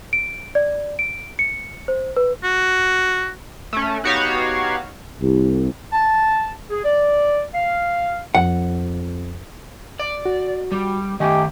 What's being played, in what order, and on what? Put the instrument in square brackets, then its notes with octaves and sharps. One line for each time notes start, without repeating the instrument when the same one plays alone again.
[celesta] D7
D5
D7
C#7
C5
B4
[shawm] F#4
[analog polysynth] A3 C#4
B3 D#4 F#4 G4 C#5 F5
[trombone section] C2
[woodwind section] A5
G#4
D5
F5
[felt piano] F2 [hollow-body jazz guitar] F#5
[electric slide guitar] D5
[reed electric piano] F#4
[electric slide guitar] G3
[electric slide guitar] D#3 A3 [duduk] G4 [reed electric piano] D#5 G#5